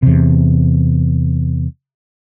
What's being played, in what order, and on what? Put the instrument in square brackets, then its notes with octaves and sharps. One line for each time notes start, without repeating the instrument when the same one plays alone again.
[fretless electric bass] E2 C3